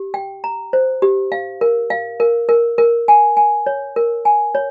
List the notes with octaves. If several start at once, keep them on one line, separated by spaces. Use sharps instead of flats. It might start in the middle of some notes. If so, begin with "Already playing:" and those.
Already playing: G4
G5
A#5
C5
G4
F5
A#4
F5
A#4
A#4
A#4
G#5
G#5
C#5
A#4
G#5
C#5